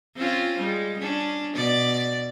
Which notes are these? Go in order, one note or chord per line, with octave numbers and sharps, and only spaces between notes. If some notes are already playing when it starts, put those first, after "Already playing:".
C4 C#4 F4
G3 G#3
C#4 D4
B2 D5